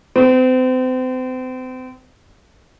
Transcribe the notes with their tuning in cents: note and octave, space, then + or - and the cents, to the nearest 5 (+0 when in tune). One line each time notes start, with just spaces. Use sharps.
C4 -35